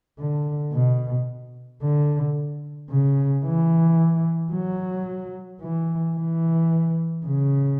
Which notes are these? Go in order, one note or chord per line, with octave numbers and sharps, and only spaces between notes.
D3
B2
D3
C#3
E3
F#3
E3
E3
C#3